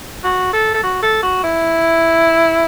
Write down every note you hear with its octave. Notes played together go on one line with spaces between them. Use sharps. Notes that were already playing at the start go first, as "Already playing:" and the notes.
F#4
A4
A4
F#4
A4
F#4
E4